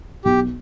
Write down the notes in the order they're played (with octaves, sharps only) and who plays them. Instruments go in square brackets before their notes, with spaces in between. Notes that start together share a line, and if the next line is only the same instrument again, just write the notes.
[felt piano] B1 [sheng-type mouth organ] G4